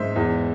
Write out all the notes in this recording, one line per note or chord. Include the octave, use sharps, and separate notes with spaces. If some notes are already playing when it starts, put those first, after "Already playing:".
Already playing: G#2 C5 E5
E2